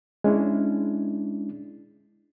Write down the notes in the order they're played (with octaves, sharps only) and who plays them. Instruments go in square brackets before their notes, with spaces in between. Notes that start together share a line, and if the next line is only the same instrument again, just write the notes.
[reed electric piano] G#3 C#4 D4 E4